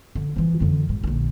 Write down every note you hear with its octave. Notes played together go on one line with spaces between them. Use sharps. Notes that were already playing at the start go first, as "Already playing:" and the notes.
D3
E3 F3
F2 D3
G#2
A#1 D3